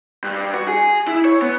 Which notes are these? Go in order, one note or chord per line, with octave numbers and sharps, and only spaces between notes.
G2
F#4
G#4
E4
C#5
B3